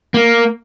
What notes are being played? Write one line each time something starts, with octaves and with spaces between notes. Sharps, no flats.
A#3